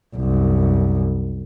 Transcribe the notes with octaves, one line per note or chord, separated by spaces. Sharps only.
C2 F#2